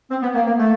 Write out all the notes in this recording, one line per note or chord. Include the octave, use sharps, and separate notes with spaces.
C4
B3
A#3
A#3
A3